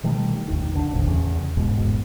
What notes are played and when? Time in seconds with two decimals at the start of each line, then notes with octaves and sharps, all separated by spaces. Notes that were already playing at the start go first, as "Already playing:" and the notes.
0.04 B2 D#3 G3 A3
0.48 A#1 D#2 D#3
0.74 D#2 D3
0.91 D1 G1 D2 A2
1.06 E2 C#3
1.57 E1 A1 G#2 B2